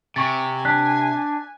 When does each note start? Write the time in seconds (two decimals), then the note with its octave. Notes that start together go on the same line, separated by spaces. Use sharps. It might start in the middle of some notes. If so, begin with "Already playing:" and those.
0.16 C3 G#5 C#6 A6
0.65 D4 F#6 B6